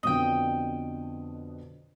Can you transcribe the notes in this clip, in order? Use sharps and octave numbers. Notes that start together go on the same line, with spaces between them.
F2 B2 D3 D#5 G5